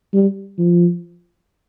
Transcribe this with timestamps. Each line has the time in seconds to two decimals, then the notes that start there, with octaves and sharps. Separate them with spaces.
0.13 G3
0.58 F3